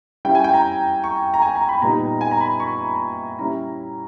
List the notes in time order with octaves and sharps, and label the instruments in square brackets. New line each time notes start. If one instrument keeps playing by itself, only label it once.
[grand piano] G3 C#4 E4 G5
G#5
G5
A#5
C#6
A#5
G#5
A#5
B5
A#2 G3 B3 D#4 A#5
G#5
A#5
B5
C#6
G3 C#4 E4 A#5